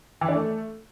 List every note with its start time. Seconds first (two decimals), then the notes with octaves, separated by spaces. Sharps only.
0.21 E3
0.29 D4
0.36 A3